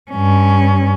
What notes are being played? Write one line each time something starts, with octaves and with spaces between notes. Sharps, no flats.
G2 C#4